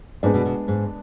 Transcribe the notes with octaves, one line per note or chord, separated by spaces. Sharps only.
G#2 G#3 B3 D4
B2
B2
G#2